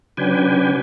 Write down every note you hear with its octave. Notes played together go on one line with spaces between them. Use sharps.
C#3 F#3 D4 B4 G5 G#5